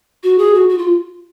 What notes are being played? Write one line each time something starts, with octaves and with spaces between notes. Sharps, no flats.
F#4
G#4
F#4
F#4
F4